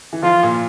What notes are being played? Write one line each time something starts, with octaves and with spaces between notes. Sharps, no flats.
E3
F3 F4
A#2